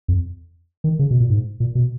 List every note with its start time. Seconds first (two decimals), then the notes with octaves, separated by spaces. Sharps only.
0.08 F2
0.84 D#3
0.99 C#3
1.11 B2
1.20 A#2
1.30 G#2
1.60 A#2
1.75 B2